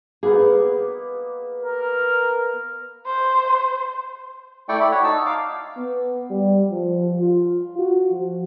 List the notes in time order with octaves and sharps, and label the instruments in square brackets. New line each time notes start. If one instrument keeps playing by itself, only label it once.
[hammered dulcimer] A#3 B3 D#4 [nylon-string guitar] G#4
[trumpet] A#4
[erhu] C5
[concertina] A3 E4 D5 G5 C#6
D5 B5
F#4 C#5 F#5
D#4 A5 E6
F5 D6
[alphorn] B3
G3
F3
F4
F#4
F3